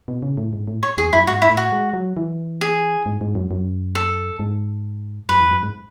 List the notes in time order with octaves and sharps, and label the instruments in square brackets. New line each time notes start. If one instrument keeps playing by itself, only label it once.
[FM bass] B2
C#3
A2
G#2
A2
[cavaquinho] C#5
[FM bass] E2 [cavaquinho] G#4
[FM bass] F#2 [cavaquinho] E4
[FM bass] G#2 [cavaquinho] F#4
[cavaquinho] E4
[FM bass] A2
[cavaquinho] F#4
[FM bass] G#3
F#3
E3
[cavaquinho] G#4
[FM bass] G#2
G#2
F#2
F#2
[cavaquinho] A4
[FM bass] G#2
[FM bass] F#2 [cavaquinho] B4
[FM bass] E2
F#2
G#2